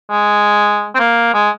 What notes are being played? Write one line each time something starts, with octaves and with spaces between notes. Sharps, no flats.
G#3
C4
A#3
G#3